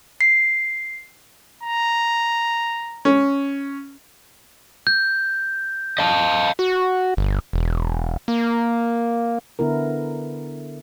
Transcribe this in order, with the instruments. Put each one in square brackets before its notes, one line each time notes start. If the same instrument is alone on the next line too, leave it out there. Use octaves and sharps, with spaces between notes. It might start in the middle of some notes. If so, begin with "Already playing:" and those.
[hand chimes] C7
[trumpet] A#5
[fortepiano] C#4
[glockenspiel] G6
[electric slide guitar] D#5 F5 A5
[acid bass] F#4
G1
E1
A#3
[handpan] D3 B3 E4 A#4